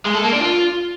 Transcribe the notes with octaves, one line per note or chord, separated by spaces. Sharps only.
G#3
A4
A#3
D4
F4